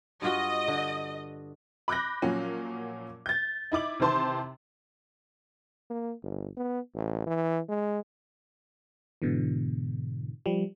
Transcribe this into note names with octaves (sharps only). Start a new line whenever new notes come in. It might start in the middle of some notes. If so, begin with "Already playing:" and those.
G2 F4 F#4 D#5
D3
B5 D6 F#6 G6 A#6
A#2 F3 F#3 A#3 C#4
G6 A6
D#4 E4 D6 F#7
C3 D#3 E3 C5 A5 C6
A#3
G1
B3
A1
E3
G#3
G#2 B2 D3 E3
F3 G3